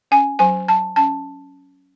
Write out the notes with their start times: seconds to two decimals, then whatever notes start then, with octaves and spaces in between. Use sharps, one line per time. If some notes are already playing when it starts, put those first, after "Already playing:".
0.11 C#4 G#5
0.39 F#3 G#5
0.68 F#3 A5
0.96 C#4 A5